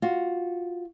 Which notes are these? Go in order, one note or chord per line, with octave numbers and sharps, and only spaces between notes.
F4 F#4